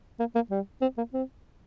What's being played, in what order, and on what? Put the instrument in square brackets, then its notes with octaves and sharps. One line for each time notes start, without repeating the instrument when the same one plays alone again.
[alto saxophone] A#3
A#3
G3
C4
A#3
C4